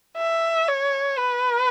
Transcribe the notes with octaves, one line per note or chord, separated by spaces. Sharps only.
E5
C#5
B4